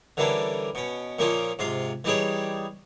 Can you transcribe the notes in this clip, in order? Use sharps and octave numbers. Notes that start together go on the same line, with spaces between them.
D3 E3 G3 A#3 C#4 D4
B2 C#4
A#2 F3 A#3 C#4 D#4 F4
G#2 C3 F4 C6
E3 G3 D#4 G4 G#4 C#5